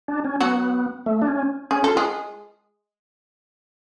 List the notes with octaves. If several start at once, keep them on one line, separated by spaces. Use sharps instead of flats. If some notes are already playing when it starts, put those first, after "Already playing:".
D4
C#4
F#3 B3 F#4
A3
D4
C#4
C#4 G#4
F4 A4
G#3 F4 G#4